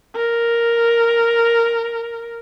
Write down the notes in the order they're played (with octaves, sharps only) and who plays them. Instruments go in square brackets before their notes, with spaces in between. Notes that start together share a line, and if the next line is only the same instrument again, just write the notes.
[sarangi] A#4